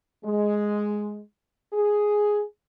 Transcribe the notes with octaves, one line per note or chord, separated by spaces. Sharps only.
G#3
G#4